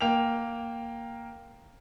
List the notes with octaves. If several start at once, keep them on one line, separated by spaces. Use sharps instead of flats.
A#3 G5 F7